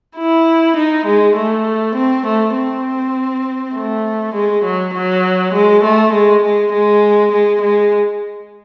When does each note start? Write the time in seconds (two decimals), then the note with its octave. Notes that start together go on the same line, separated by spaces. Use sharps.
0.17 E4
0.77 D#4
1.06 G#3
1.36 A3
1.95 C4
2.26 A3
2.56 C4
3.74 A3
4.34 G#3
4.64 F#3
4.94 F#3
5.53 G#3
5.83 A3
6.13 G#3
6.43 G#3
6.72 G#3
7.32 G#3
7.61 G#3